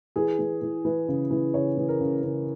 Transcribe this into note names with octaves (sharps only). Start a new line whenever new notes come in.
E3 G#4
E3
E3
E3 B4
C#3
E3
C#3 C#5
E3
A#4
C#3
C#3 A#4